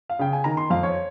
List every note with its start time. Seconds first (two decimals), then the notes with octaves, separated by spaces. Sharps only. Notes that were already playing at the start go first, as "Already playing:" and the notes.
0.09 F5
0.19 C#3 G5
0.33 G#5
0.44 D#3 A#5
0.57 C6
0.70 F2 F5
0.83 C#5